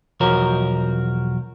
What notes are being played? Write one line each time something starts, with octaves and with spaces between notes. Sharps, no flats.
B1 E2 F3 F#4 A#4 C#5